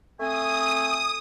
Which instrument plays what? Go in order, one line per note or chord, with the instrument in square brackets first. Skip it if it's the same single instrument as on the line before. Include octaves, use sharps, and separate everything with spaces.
[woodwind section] A3 C4 G#5 [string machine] D#6